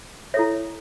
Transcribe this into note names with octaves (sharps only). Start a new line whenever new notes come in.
E4 A4 C#5 E5